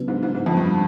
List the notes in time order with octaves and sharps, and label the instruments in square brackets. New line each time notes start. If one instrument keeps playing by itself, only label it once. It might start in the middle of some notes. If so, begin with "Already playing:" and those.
Already playing: [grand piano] C#3 F#3 B3 D4
[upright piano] G#2
G#2
G#2
F2
G2